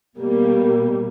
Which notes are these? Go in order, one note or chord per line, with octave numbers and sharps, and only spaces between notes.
B2 G3 A#3